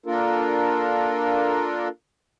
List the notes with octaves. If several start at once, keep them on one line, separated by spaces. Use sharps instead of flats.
A#3 D4 F4 A4 A#4